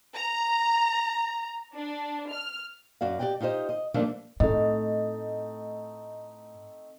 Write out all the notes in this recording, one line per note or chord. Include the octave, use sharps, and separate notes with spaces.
A#5
D4
F6
F#2 F#4 D5 F5
G4 G#4 D5 D#5 G5
D#4 F4 G4 C5 D#5
D#5
F3 G3 A3 A#3 D4 D#4
A2 A3 C4 D#4 D#5